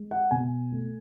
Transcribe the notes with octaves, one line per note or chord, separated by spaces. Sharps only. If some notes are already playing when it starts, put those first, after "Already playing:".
Already playing: G#3
F#5
B2 G#5
A3